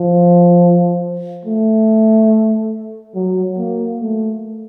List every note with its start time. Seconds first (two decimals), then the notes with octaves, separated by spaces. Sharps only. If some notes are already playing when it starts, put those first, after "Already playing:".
Already playing: F3
1.45 A3
3.15 F#3
3.58 A#3
4.01 A3